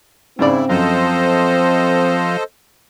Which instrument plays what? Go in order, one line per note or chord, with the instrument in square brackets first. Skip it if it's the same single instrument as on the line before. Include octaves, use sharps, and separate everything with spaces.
[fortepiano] G#2 C#3 D5 [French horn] C4 [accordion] E4
[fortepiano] F#2 [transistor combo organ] F3 [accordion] A4 C5 D#5